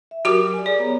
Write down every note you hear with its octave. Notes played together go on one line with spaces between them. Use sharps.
E5
F#3 F#4 G4 A#4 D6
D5 G#5
G#4 D5
B3 C#5 A#5